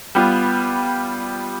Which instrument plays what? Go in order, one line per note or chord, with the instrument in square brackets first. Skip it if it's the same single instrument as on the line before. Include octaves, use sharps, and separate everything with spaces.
[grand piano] G3 B3 F4